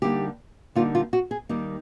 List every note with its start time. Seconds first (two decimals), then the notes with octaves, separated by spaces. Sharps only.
0.02 D3 G3 A#3 D#4 G4
0.75 D3 G3 A#3 D#4 F4
0.95 F4
1.13 F#4
1.31 G#4
1.49 D#2 D#3 G3 A#3 D#4